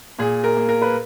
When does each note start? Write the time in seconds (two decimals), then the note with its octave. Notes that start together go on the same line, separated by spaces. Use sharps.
0.19 A#2 G#4
0.44 A#4
0.57 A#3
0.69 A#4
0.82 B4